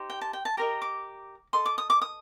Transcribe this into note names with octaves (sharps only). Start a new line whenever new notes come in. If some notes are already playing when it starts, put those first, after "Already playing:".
Already playing: D#4 G4 C5
G5
A5
G5
A5
G4 A#4 D#5 A#5
D6
A4 D#5 C6
D6
D#6
D6
D#6